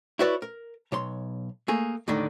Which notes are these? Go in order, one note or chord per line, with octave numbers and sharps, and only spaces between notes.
E4 F#4 B4 C#5 D5 E5
A#4
B1 C#5 C6
A3 A#3 G#4
D#2 A2 D3 D4 D#4